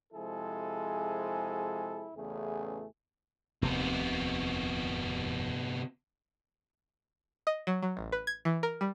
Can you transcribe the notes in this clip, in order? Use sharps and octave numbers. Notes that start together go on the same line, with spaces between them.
C3 F3 G#3 E4 G#4 A4
A1 E2 C#3 A3 G#4
F1 D#2 C3 B3
D#5
F#3
F#3
A1
B4
G#6
E3
A#4
G3